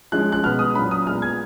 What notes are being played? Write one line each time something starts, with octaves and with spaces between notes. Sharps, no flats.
F3 G#3 C#4 F#6
F#6
B2 G#3 B3 F6
D#6
A#2 F#3 C#4 B5
D#6
A#2 G#3 B3 F6
G#6